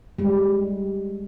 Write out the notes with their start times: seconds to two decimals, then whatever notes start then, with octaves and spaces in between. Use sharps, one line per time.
0.19 G3 G#3